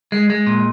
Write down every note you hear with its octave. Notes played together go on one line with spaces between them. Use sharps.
G#3
G#3
A#2